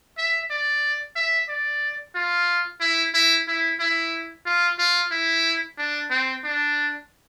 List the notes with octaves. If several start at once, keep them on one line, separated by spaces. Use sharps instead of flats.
E5
D5
E5
D5
F4
E4
E4
E4
E4
F4
F4
E4
D4
C4
D4